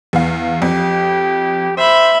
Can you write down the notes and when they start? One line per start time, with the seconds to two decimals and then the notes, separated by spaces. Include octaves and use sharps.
0.13 E2 F5
0.62 F2 G4
1.77 C5 E5 B5